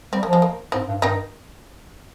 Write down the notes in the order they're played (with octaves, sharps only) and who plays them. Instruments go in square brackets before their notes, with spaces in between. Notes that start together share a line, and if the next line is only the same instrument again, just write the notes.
[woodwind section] G3 [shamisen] C4
[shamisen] A#3
[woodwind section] F3
[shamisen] G#3
A#3
[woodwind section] G#2 [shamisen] C4
[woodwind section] G2
[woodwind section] G2 [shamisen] D#3 D#4